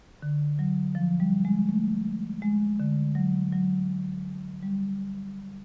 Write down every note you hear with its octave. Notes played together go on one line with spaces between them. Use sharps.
D3
F#3
F3
G3
G#3
A3
G#3
D3
F#3
F#3
G3